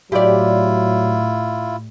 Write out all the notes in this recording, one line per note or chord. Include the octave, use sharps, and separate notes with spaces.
A2 F#3 E4 F4 G4 D5